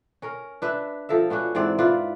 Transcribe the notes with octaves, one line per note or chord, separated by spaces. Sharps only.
C#4 A#4
D4 B4 E5
F3 A4 A#4 E5
B3 C#4 D4 F#4
G#2 E3 C4 D5
E4 F4 B4 D5